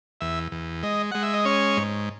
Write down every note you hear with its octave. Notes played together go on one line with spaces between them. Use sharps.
E2 E5
E2
G#3 D#5
G#3 F#5
E5
D#5
C#4 C#5
G#2